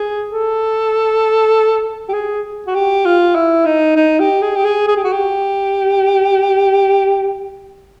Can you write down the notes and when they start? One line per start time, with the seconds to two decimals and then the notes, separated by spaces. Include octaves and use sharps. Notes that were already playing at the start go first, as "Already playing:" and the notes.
Already playing: G#4
0.31 A4
2.09 G4
2.14 G#4
2.67 F#4
2.75 G4
3.06 F4
3.35 E4
3.66 D#4
3.96 D#4
4.20 G4
4.42 G#4
4.56 G4
4.65 G#4
4.88 G#4
4.96 G4
5.04 F#4
5.13 G4